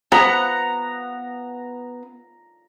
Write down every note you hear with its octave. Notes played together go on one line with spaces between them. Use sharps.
B3 F#5 A#5